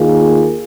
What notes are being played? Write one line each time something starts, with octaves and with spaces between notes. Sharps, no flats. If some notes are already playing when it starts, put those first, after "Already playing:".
Already playing: D#2 D#3 A#3 F4 G#4